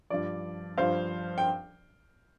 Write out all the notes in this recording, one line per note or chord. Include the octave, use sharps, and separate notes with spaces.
G2 F3 D5
G2 F3 C5 F5
G5